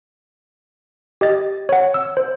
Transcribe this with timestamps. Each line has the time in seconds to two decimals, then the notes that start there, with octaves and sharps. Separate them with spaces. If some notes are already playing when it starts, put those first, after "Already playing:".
1.21 G4 D#5 A6
1.69 C#5 F#5
1.94 E6
2.17 C5